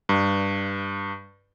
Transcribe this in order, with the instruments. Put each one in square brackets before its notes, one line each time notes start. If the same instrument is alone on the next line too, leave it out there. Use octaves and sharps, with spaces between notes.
[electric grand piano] G2